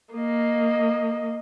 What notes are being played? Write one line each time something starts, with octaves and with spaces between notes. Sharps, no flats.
A#3 D#5